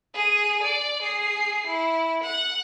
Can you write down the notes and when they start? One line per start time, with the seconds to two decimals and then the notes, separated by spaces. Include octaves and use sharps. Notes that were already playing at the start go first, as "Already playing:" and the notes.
0.14 G#4 D#7
0.63 D5
1.02 G#4 C7
1.67 E4
2.23 F#5